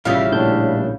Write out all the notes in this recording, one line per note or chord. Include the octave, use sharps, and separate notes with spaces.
A1 C#3 G3 E4 F4 E5 F5
A#1 A2 D4 G6